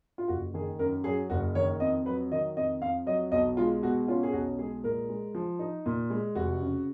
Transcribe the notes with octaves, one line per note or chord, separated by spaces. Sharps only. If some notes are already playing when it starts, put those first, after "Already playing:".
F4
F#1 F#4
D#3 G#4
F#2 A#4
F#3 G#4
F#1 F#4
D#3 C#5
F2 D#5
F#3 B4
D#3 D#5
F2 D#5
F2 F5
F#3 D#5
B1 D#5
G#3 F4
B2 F#4
C#4 F4
G#4
B1 F#4
G#3 G#4
A#2 A#4
G#3
F3
D#4
A#2
G#3
F1 F#4
C#3